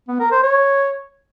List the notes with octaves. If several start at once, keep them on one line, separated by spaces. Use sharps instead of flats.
B3
A#4
C5
C#5